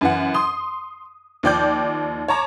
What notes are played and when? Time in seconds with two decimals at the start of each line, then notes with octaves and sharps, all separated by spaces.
0.01 F#2 E3 F#5
0.34 C6 D#6
1.43 D#2 F3 D5 G5 D6 G6
2.28 C#5 A5 A#5 D6